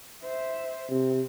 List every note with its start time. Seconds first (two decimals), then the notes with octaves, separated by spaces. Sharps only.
0.23 C5 E5
0.90 C3 C4